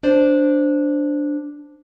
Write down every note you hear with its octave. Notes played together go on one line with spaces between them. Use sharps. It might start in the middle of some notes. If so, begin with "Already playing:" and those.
D4 C5 D5